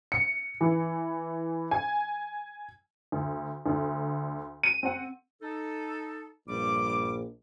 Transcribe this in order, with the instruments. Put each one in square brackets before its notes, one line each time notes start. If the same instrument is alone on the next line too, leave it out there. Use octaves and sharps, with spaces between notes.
[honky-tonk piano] C#7
E3
G#5
D2
D2 D3
D#7
C4 F#5
[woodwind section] D#4 A4
[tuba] A#1 [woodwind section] G2 G3 D6